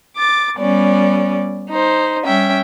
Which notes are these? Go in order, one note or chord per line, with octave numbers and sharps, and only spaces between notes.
D6 A6
G3 B3 C#4 D5
D#4 C5
G3 C#4 E5 G5